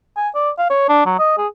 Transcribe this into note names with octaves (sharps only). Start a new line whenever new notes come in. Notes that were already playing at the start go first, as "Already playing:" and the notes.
G#5
D5
F5
C#5
D4
F#3
D#5
G#4